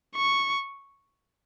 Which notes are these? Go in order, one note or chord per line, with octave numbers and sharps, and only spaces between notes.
C#6